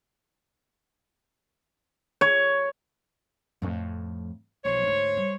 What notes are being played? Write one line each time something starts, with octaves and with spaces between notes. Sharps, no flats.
C#5
F2 A2
B1 F3 C5 C#5
D2 G#2
G3